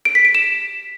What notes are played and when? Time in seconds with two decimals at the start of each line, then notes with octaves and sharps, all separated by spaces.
0.05 D7
0.15 B6
0.25 D7
0.35 E7